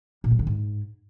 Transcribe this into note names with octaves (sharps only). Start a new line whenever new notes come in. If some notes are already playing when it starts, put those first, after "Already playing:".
A#2
F#3
D3
G#2